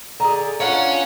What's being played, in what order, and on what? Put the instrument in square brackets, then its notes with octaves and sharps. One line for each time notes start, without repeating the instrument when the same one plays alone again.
[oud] D3 G#4 [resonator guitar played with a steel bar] A#5
[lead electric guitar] C#4 C#5 [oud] D4 F4 [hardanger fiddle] F#5